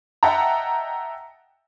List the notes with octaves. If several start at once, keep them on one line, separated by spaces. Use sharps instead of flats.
D#5 E5 F#5 G5 A5 A#5